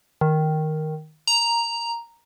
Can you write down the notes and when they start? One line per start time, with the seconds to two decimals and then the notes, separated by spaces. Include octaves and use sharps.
0.21 D#3
1.27 A#5